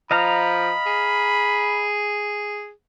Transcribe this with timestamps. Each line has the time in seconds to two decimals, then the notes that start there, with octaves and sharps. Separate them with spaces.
0.11 F3 D#5 F5 A#5 B5
0.86 G#4